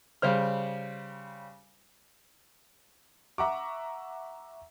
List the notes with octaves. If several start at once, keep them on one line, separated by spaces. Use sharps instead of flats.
C#3 G3 C5 F6
E5 F#5 A#5 C#6 D6